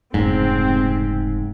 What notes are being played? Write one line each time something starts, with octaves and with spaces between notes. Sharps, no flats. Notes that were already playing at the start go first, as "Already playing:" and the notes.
F1 G#2 C#3 C4